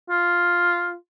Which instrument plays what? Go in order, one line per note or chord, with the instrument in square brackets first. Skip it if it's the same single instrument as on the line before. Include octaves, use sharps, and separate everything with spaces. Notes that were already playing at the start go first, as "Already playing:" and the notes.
[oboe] F4